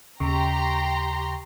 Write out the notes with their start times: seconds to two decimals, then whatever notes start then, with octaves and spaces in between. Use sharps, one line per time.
0.20 D#2 C#3 G4 A#5 C6 C#6